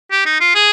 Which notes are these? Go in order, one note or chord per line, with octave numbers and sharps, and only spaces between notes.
G4
D#4
F4
G#4